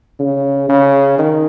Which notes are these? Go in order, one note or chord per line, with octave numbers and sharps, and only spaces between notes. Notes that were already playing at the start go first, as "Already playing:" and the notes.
C#3
C#3
D#3